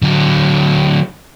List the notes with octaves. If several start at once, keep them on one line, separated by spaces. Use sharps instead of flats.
D3 F#3